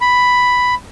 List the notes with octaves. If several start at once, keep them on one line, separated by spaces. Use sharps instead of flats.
B5